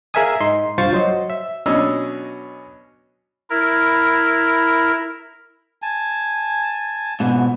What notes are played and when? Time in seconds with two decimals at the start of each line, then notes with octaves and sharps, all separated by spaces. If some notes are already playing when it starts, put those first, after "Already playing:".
0.14 G#4 A#4 E5 F5 G#5 D#6
0.41 G#2 D#4 C6
0.78 C2 G2 F4 C5 C#6 A6
0.93 F#3 C5 D#5
1.30 E5
1.66 B2 F#3 C#4 D4 D#5 E6
3.50 E4 A#4
5.82 G#5 A5
7.20 G#2 B2